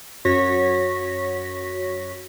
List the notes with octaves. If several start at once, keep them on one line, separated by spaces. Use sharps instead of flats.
F#2 F#4 C#5 C#6 A#6 B6